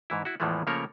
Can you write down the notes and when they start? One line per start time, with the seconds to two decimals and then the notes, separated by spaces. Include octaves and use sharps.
0.10 G#2 E3 E4
0.25 E4 F#4
0.40 E2 A2 E3 F3 G#3 A3
0.67 C#3 F3 A3 A#3 A#4 C#5